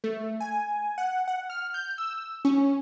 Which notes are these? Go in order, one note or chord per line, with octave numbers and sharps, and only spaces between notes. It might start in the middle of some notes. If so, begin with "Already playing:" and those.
A3
G#5
F#5
F#5
F6
G6
E6
C#4